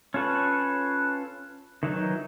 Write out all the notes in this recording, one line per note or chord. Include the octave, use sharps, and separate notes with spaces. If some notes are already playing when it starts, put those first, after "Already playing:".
C#4 F4 A4 B4 C#6
D#3 E3 F#3 D#4